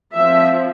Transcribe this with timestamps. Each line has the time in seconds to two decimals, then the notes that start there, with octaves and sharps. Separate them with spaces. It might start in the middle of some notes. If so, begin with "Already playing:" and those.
0.14 F3 C4 E5